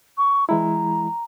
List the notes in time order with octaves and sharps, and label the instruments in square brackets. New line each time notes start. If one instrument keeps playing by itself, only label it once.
[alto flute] C#6
[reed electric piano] E3 G#3 E4 [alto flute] A#5